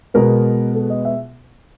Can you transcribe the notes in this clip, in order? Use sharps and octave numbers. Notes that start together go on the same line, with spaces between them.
B2 G#3 B3 A#4
A4
D#5
E5